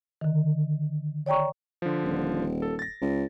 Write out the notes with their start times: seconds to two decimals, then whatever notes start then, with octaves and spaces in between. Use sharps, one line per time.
0.21 D3 D#3
1.26 C#5 D5 G5 A#5 C#6
1.82 D3 F3
2.04 D#1
2.62 A4
2.79 A6 A#6
3.01 C#2